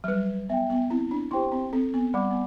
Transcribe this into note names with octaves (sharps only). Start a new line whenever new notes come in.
F#3
G3 B4
B3 E5 G5
B3
C4 E4
D4
E4 G4 C5 G5 C6
C4
C4 A4
B3
G3 D5 F#5 B5 D6
B3